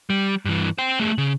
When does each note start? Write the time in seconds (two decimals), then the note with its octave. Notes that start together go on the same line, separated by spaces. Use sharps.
0.10 G3
0.45 G2 E3
0.78 C5 G5
1.00 A3 G#4
1.18 C#3